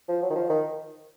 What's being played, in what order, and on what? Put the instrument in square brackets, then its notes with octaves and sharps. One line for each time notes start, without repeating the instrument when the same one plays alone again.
[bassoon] F3
F#3
D#3
F3
D#3